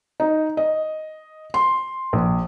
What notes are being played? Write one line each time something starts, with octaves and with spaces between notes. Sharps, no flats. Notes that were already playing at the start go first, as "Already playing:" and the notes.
D#4
D#5
C6
A#1